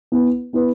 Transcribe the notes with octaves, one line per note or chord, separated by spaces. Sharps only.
B3 E4 B4
B3 E4 B4